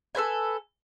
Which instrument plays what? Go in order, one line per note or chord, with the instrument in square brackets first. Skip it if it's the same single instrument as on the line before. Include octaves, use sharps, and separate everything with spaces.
[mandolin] A4 B4 C5 G#5